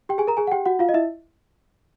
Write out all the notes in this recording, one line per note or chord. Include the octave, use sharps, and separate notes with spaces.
G4 G5
G#4 G#5
A#4 A#5
G#4 G#5
F#5
G4 G5
F#4 F#5
F4 F5
D#5
E4 E5